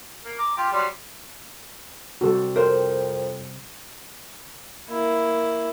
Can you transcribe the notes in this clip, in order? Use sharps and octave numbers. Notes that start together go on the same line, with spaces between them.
A#3
A#5 D6
F4 G4
F#3 G3 C6
C3 G3 F#4 A4
F2 A#4 C5
A#3 E4